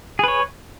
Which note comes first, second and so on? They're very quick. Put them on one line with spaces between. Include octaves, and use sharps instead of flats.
G#4 B4 C#5